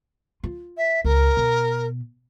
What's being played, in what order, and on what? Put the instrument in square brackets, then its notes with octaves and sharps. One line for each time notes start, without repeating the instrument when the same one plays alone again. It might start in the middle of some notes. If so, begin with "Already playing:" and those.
[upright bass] F4
[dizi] E5
[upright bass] C#2 [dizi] A#4
[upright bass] B2